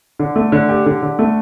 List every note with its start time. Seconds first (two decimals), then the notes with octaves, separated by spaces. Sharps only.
0.20 D3
0.36 A3
0.52 D3
0.69 G4
0.86 D3
1.02 D3
1.19 A3